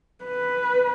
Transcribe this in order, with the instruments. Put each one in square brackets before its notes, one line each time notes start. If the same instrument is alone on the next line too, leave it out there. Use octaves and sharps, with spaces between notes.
[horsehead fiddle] B4